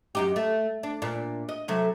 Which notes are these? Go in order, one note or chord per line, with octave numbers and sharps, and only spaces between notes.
F#2 D#4 G4
A3
D4
A#2 D4
D#5
C3 F#3 A3